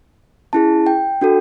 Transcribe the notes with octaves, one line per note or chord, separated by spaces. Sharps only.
C#4 E4 G#4 A5
G5
D4 F#4 A4